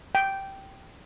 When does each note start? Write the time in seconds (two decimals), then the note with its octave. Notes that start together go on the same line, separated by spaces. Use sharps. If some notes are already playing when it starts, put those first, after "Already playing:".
0.15 G5